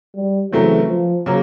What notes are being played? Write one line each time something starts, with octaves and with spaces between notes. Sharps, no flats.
G3
C#3 E3 F#3 A3 C4
F3
C#3 F#3 A#3